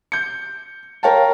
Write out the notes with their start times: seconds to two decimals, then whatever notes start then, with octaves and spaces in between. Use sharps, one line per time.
0.12 G6 C#7
1.03 A#4 C#5 F5 G5 A5